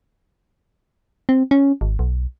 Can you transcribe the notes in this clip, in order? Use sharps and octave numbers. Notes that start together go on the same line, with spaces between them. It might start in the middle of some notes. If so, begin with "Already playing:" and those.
C4
C#4
G#1
B1